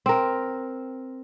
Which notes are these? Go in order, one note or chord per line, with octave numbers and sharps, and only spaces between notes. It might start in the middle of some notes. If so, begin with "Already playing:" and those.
C4 A#4